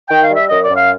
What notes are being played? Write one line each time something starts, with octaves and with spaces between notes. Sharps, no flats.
D#3 G5
F5
G3
E5
F#2 D#5
D5
F#2
F5